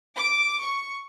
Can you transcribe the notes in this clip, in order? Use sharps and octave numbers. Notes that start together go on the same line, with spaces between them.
D6
C#6